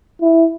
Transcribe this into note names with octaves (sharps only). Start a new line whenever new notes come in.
E4